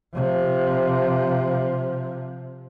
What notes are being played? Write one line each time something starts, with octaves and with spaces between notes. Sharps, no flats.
C3 F3